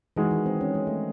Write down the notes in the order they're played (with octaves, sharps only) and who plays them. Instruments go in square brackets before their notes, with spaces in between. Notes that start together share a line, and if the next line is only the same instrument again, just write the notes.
[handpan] E3 [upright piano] G#3 D#4 F#4
[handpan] D#3
C4
C#4
G#3
A3